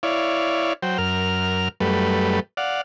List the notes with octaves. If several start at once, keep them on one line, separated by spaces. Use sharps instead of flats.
E4 C#5 D5 F5
F#3 C5 G5
F#2 A#4 F6
F#2 G3 A3 B4
D5 F5 F#5